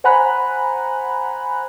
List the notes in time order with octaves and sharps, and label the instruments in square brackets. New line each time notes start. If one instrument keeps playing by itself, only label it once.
[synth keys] C5 F#5 G#5 A#5 B5 F#6